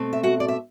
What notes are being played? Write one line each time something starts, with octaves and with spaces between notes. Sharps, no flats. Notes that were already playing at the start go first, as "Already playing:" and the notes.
Already playing: B2 A3 C4
E5
F#4 F#5
D5
E5